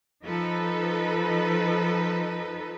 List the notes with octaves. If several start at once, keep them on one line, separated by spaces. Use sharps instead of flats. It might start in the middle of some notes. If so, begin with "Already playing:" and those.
F3 D#4 A4 B4